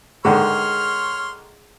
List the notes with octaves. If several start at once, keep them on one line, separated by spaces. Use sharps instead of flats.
G#2 D3 D#3 G#4 C#5 F#5 C6 F6